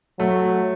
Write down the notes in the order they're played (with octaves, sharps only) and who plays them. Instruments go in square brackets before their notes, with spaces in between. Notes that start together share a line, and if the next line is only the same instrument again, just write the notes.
[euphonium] F#3 [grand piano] A3